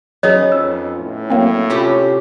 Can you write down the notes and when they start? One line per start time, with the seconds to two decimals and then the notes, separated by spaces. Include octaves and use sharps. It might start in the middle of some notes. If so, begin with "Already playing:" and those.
0.23 F#3 B3 C#4 D#4 G#4 C#5 D#5 D#6
0.52 F2 E6
1.00 A2
1.30 F#3 A#3 C4
1.70 C3 C#4 F4 G4